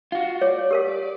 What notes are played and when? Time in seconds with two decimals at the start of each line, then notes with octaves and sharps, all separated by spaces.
0.12 F4 F#4
0.41 C#5 D5
0.71 G4 A#4 F5